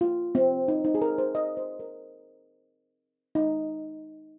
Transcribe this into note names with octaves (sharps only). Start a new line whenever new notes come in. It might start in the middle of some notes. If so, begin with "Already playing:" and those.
F4
C4
D#4
D#4
G#4
A#4
C5
D#5
C5
A#4
D#4